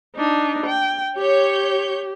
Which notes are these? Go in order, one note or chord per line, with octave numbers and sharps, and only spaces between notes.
D4 D#4
G5
G4 C#5 G6